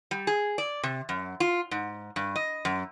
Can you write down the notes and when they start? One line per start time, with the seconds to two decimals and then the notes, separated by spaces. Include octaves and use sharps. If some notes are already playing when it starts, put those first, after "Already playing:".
0.11 G3
0.27 G#4
0.58 D5
0.83 C3
1.09 F#2
1.40 F4
1.71 G#2
2.16 G2
2.36 D#5
2.65 F#2